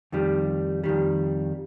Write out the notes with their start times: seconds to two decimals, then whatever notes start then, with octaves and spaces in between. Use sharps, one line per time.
0.12 F2 D#3 G3
0.84 F2 D#3 G3